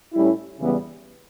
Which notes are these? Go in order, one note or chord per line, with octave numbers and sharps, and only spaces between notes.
A2 G3 C#4 E4
E2 C#3 E3 G3 B3